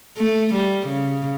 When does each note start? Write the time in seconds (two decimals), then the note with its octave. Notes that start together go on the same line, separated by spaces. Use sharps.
0.17 A3
0.54 G3
0.87 C#3